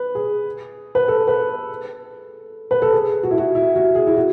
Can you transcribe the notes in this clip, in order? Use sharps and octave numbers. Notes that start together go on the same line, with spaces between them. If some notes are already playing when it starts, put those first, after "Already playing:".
Already playing: B4
G#4
B4
A4
B4
B4
A4
G#4
F#4
E4
F#4
E4
F#4
G#4
E4
F#4